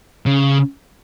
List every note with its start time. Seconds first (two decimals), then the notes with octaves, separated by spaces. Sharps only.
0.26 C#3